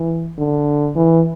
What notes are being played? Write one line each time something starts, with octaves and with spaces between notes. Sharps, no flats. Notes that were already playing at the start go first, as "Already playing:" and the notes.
Already playing: E3
D3
E3